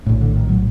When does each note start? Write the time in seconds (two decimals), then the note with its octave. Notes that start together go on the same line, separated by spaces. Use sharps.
0.06 A#1 A2
0.21 D3
0.36 D#3
0.49 F#3